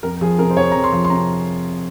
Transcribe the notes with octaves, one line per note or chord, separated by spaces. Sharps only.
F2 A#4
F3 G#4
C3 A#4
C5
F2 C#5
F2 A#5
C6
F3
C6
C3 A#5